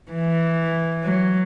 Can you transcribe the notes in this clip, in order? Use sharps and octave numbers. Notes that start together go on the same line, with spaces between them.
E3
F#3